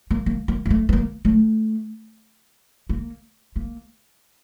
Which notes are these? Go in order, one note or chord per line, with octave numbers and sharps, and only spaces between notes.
A#3
A#3
A#3
A#3
A3
B3
A#3
A3
A#3
A#3